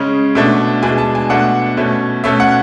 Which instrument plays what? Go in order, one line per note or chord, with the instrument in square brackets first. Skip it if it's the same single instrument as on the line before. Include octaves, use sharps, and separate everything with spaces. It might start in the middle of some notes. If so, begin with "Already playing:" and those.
Already playing: [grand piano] C#3 G#3 C#4
B2 A3 D4
B2 G#3 D4 G#5
A5
G#5
B2 A3 D4 F#5
B2 A3 C#4
B2 A3 C#4 E5
F#5